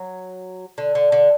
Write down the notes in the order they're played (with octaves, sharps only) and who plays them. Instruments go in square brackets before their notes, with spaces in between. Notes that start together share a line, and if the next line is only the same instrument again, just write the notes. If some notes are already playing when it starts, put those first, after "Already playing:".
Already playing: [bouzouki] F#3
D3
D3
D3